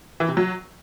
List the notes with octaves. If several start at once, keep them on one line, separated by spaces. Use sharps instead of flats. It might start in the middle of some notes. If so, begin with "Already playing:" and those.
E3
C3
F#3